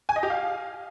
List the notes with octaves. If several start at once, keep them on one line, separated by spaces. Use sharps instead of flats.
G#5
D#5
G4
F5